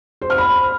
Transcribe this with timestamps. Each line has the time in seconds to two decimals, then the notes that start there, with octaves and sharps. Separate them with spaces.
0.21 C5
0.30 F6
0.38 B5